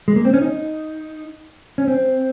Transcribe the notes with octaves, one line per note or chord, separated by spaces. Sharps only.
G#3
A#3
C4
C#4
D#4
C#4
C4